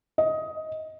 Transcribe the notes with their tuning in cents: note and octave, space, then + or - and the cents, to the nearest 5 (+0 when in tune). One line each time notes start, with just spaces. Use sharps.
D#5 +15